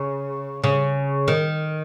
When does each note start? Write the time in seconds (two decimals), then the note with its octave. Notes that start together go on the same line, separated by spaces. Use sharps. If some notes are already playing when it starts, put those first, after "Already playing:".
Already playing: C#3
0.64 C#3
1.28 D#3